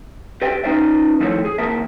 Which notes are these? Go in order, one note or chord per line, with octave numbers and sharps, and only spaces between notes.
G4 B4 D5 E5 G5
C#4 D#4 B4 C5 D5 E5
D#3 F3 A3 E4 C5 C#5
G#4
D#2 E3 A#3 A#4 E5 A5